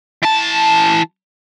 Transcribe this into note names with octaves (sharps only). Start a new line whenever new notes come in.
E3 A5